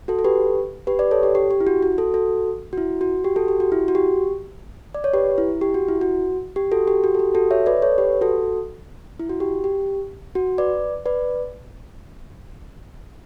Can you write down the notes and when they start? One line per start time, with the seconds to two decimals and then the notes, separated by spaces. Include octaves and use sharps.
0.08 F#4 A4
0.19 A4
0.24 G4 B4
0.87 G4 B4
0.99 B4 D5
1.11 A4 C#5
1.23 G4
1.35 G4
1.51 G4
1.60 E4
1.67 F#4
1.83 F#4
1.98 F#4 A4
2.14 F#4 A4
2.73 F#4
2.77 E4
3.01 F#4
3.24 G4
3.36 F#4 A4
3.48 G4
3.60 F#4
3.72 E4
3.88 F#4
3.95 G4
4.95 D5
5.04 C#5
5.14 G4 B4
5.38 E4
5.61 G4
5.74 F#4
5.88 E4
6.01 F#4
6.56 G4
6.72 F#4 A4
6.88 G4
7.04 F#4
7.15 A4
7.19 G4
7.35 F#4 A4
7.51 C#5 E5
7.66 B4 D5
7.82 A4 C#5
7.98 G4 B4
8.21 F#4 A4
9.19 E4
9.29 F#4
9.40 G4
9.64 G4
10.35 F#4
10.58 B4 D5
11.06 B4 D5